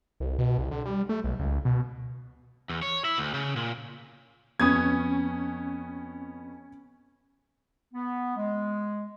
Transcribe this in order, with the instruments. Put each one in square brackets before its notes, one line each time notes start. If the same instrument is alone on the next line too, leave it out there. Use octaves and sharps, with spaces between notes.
[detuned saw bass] C2
B2
C2
D3
G3
A3
B1
C#2
B2
[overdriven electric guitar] E2
C#5
E4
D2
C#3
A#2
[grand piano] F2 B3 D#6 [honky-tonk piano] C#4 G#6
[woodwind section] B3
G#3